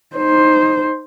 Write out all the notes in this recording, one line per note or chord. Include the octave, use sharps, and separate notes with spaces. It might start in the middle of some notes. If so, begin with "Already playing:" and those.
D#4 C5